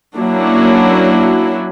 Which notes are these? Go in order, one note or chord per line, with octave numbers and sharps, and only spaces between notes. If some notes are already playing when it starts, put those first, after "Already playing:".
F#3 A#3 C#4 D4 E4 F#4